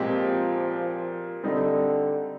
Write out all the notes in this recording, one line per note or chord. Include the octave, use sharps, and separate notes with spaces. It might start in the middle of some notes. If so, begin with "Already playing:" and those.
Already playing: A#2 F3 G#3 C4 G4
D3 G3 C4 D#4